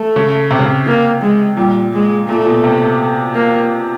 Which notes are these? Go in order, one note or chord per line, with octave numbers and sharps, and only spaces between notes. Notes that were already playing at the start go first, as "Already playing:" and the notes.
Already playing: A3
C#3
C3
C#3
C3
A#3
G#3
A#2 G3
G#3
A#2 A3
A#2
B2
C3
A#3